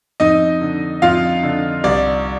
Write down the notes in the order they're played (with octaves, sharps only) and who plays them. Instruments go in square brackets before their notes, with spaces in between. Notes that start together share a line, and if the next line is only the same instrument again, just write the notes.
[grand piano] F2 D#4 D#5
D3
F2 F4 F5
D3
C2 D5